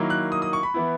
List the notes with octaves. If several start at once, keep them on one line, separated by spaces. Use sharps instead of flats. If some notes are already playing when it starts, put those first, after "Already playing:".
Already playing: D#3 F#3 A#3 E4
F#6
D#6
D#6
C#6
B5
E3 B3 E4